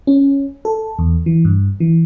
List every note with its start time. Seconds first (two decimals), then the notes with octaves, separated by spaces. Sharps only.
0.07 C#4
0.65 A4
0.99 E2
1.26 E3
1.45 G2
1.80 E3